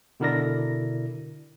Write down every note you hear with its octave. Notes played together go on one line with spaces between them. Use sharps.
B2 D3 E4 A#4 D5 A#6